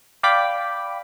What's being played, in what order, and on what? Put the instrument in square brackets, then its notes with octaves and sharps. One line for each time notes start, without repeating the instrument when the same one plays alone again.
[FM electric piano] D5 F5 G5 B5 D6 B6